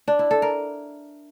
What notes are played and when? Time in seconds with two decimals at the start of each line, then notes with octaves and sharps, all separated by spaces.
0.08 D4
0.19 E4
0.31 A4
0.42 A#4